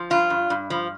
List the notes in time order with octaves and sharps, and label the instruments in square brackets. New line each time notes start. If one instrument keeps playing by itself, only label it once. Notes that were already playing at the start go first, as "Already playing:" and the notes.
Already playing: [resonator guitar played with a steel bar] F3
G2 F4
G2
G2
F3